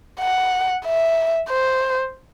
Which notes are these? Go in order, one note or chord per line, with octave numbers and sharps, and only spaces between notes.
F#5
E5
C5